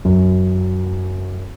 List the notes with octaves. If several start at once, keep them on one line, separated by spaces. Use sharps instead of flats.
F#2